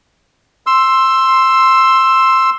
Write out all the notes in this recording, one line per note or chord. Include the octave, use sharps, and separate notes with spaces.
C6 E6